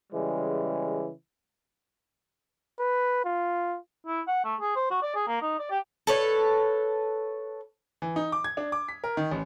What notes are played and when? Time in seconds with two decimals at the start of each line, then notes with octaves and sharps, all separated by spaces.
0.13 C#3 E3 G3 G#3
2.80 B4
3.25 F4
4.06 E4
4.27 F#5
4.45 A3
4.60 G#4
4.76 C5
4.90 F#4
5.02 D5
5.15 G#4
5.28 A#3
5.42 D#4
5.59 D5
5.71 G4
6.07 A4 B4 C#5
8.02 E3
8.16 D#4
8.32 D6
8.44 G#6
8.57 D4
8.72 D6
8.89 B6
9.04 A#4
9.17 D#3
9.31 A1